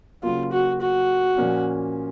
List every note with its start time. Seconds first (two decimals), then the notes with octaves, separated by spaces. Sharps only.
0.23 C#3 F#3 A#3 F4
0.52 F#4
0.81 F#4
1.37 A#2 F3 A#3 C#4